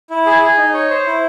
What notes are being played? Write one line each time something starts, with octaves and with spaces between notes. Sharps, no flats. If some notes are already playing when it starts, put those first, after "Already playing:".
E4
G#4
G#4
D#4
C#5
C5
E4